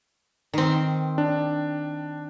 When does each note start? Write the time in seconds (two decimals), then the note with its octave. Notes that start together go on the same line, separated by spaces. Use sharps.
0.54 D#3 C4
1.18 D4